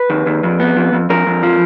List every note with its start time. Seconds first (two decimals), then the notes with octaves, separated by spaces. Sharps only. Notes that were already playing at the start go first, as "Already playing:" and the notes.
Already playing: B4
0.10 D#2
0.26 D#2
0.43 F2
0.60 B3
0.77 F2
0.93 F2
1.10 F2 A#4
1.27 F2
1.43 F3